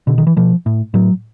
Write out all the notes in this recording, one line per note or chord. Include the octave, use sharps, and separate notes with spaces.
B2 D3
D#3
E3
B2 F3
A2
A2 F#3